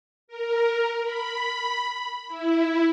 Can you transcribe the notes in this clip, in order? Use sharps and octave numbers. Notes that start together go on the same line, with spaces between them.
A#4
B5
E4